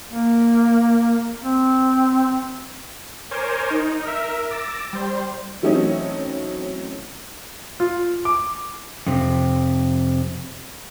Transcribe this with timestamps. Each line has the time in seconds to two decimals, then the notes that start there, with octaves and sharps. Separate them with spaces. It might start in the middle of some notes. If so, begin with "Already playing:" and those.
0.12 A#3
1.42 C4
3.31 A#4 C5 C#5 G#5 D6 G6
3.70 D#4
4.05 A#4 E5
4.50 D6 E6 A6 A#6 D7
4.93 G3 C5
5.62 E3 F#3 A3 C4 C#4 D#4
7.80 F4
8.25 D6
9.07 F2 C3